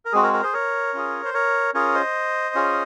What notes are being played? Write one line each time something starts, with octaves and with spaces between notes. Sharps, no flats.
A#4
G#3 C4 F#4 G#4
A#4
A#4
G#4 C5
A#4 C#5
C#4 F4 G#4
C5
A#4 C#5
C#4 F4 G#4 A#4 C#5
C5 D#5
C#4 F4 G#4